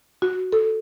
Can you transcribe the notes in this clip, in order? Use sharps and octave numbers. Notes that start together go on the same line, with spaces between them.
F#4
A4